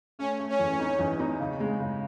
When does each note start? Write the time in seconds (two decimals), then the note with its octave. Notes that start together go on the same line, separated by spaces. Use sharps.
0.19 A3 C#4
0.39 A3
0.49 C#4
0.59 E2
0.79 D#4
0.99 E2
1.20 D#4
1.40 C#3
1.60 G#3
1.80 C#3